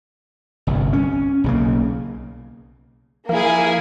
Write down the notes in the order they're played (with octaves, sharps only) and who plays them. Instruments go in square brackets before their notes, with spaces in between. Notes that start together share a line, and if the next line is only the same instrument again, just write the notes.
[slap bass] G1 C2
C#4
B1 C#3 A#3
[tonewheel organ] F3 A#4 F5 [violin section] A#3 E4 G#4